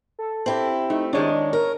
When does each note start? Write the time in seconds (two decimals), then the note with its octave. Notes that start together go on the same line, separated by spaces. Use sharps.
0.19 A4
0.46 C4 E4 G4
0.90 A3 D#4
1.13 D#3 G#3 D4 C#5
1.53 A#4